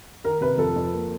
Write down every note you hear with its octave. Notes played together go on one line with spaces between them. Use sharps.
D#3 A#4
C3 B4
F2 A4
F2
A#3